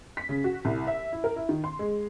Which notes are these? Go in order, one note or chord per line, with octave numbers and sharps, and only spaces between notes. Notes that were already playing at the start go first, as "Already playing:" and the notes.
B6
C#3
F#4
C2
E5
E4
A#4
E4
D#3
C6
G#3